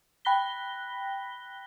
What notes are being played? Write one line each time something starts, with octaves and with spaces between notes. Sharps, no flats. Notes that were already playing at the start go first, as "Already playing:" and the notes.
G5 B5 F#6 A#6 B6 G7